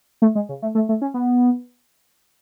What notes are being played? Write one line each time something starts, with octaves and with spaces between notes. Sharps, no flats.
A3
G#3
C#3
A3
A3
A3
C#4
B3